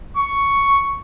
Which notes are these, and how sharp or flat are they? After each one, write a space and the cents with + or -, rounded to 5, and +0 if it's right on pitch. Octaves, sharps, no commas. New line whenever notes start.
C#6 +5